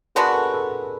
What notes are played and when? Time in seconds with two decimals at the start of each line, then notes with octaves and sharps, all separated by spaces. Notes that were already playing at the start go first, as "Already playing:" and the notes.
0.15 G#3 B3 D4 F#4 G#4 A#4
0.34 A4 B4
0.53 A4 B4